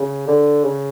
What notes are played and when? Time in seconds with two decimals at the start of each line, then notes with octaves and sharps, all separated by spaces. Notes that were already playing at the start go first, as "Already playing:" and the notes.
Already playing: C#3
0.27 D3
0.64 C#3